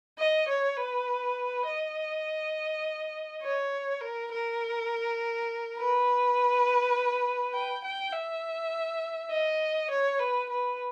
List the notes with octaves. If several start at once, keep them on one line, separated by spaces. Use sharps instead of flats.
D#5
C#5
B4
D#5
C#5
A#4
A#4
B4
G5
G5
E5
D#5
C#5
B4
B4